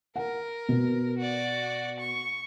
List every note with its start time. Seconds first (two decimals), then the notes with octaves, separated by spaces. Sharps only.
0.16 A#4 F#5
0.69 B2
1.18 F#4 D5
2.00 C#6